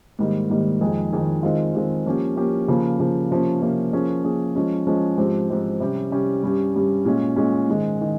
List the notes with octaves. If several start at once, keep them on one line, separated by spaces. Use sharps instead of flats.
G#2 D#3 G3 A#3
G#2 D#3 G3 A#3
F2 D#3 G#3 D#4 G#4
F2 D#3 G#3 D#4 G#4
D#3 G#3 C4 F4
D#3 G#3 C4 F4
F3 A#3 C#4 G4
F3 A#3 C#4 G4
C#3 F3 A#3
C#3 F3 A#3
C3 F3 A#3 C#4
C3 F3 A#3 C#4
F3 A#3 C#4 G#4
F3 A#3 C#4 G#4
F3 G#3 C#4
F3 G#3 C#4
G#2 F3 C4 G4
G#2 F3 C4 G4
C3 G3 C#4 G4
C3 G3 C#4 G4
G2 G3 C#4 G4
G2 G3 C#4 G4
A#2 G#3 C#4
A#2 G#3 C#4
G#2 D#3 G#3
D#3